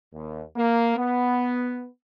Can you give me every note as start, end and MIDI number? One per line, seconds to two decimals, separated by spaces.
0.13 0.44 39
0.55 0.94 58
0.96 1.85 59